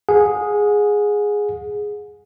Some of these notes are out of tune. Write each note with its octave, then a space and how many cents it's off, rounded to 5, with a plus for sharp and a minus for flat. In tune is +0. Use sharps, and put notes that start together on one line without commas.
G#4 +0 F#5 -40